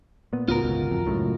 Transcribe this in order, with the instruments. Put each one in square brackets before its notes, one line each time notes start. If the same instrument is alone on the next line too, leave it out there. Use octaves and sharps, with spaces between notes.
[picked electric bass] A#2 B3
[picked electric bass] C#2 A2 B3 [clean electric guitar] F4 F#4 A#4
[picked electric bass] G1 C#2 B2
D1 F2
C#2 F#2 A2